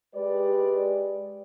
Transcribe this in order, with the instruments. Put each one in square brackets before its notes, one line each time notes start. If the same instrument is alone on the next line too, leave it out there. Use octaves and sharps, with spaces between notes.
[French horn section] G#3 G4 B4 D5